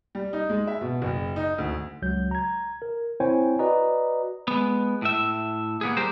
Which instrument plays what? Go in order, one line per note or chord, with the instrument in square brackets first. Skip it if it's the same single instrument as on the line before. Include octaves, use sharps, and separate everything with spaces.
[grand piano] G3
D#4
G#3
E5
B2
F#1
D#4
D2
[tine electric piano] C#2 F#3 G6
A#5 G#6
A#4
C4 E4 C5 C#5 G5 G#5
F#4 B4 D5 D#5 A#5
[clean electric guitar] G#3 B3
A2 E5
A#3 B3 G#4
G3 G4 A#4 C5